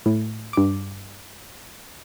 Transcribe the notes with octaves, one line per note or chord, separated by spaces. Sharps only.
A2
G2 D6